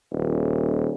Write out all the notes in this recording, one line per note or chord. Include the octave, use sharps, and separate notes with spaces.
D#1